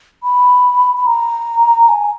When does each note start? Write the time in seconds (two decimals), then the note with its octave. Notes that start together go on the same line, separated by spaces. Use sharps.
0.23 B5
0.97 B5
1.07 A#5
1.89 G#5